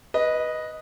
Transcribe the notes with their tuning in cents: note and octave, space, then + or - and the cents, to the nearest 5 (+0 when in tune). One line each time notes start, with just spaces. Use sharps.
B4 -10 D#5 +0